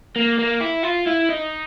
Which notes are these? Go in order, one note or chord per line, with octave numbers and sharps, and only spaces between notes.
A#3
A#3
E4
F4
E4
D#4